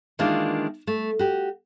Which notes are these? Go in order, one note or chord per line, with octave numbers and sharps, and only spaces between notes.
D#3 E3 G#3 A#3 D4 F4
A3
F#4 G4